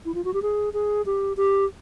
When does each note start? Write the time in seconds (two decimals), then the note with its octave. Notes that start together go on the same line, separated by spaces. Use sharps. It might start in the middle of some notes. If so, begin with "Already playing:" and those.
0.05 E4
0.15 F4
0.25 F#4
0.34 G4
0.42 G#4
0.73 G#4
1.06 G4
1.37 G4